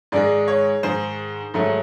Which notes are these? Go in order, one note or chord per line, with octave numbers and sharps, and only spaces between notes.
G#2 D#3 G#3 D5
C#5
G#2 D#3 G#3 C5
G#2 D#3 F#3 A3